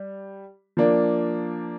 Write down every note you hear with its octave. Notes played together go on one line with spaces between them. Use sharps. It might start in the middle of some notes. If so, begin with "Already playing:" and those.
Already playing: G3
F3 A#3 D4